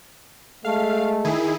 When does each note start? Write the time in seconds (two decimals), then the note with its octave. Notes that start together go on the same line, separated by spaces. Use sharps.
0.65 G#3 A3 F5
1.25 D#3 E4 G#4